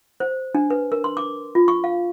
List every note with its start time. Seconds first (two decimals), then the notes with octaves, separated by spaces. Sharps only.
0.20 C5
0.55 D4
0.70 B4
0.92 A#4
1.04 C6
1.17 D6
1.55 F4
1.68 C#6
1.84 F5